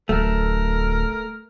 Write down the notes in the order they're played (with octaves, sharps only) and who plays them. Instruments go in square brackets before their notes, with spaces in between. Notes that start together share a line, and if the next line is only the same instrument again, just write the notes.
[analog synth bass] D1 [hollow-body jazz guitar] A3 [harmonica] A#4